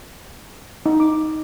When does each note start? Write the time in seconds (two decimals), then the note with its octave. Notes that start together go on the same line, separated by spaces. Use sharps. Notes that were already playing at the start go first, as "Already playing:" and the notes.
0.86 D#4
1.00 D6